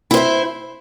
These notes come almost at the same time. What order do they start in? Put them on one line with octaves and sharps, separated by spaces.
E4 C5 E5